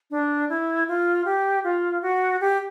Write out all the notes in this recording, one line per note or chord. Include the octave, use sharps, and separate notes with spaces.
D4
E4
F4
G4
F4
F#4
G4